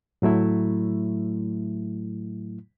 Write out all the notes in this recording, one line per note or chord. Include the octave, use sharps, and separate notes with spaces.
A2 F#3 A3 E4